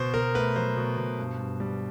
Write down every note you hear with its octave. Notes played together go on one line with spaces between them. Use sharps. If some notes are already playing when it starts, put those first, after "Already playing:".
Already playing: B2 C5
B2 A#4
A3 B4
F#3 C5
B2
B2
G2
G2
G3